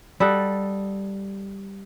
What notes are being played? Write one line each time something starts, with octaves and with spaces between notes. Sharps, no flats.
G3 A4 D#5 F#5